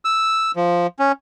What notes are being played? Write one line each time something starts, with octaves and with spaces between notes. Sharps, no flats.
E6
F3
C#4